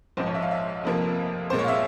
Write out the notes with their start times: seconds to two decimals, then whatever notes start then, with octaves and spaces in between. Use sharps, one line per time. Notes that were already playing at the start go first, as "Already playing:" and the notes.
0.17 A#1 G#2 F3 C5
0.26 C#5
0.35 E5
0.42 F5
0.51 E5
0.83 F1 F2 C3 F3 A#3
1.50 C2 A#2 G#3 C5
1.59 C#5
1.64 F5
1.68 E5